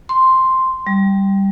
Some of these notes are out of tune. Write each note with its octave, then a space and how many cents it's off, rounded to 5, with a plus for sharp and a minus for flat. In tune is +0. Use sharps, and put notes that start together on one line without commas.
C6 +0
G3 +0